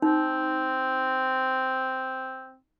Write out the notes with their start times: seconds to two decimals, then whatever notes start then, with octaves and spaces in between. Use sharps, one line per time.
0.02 C4 D#4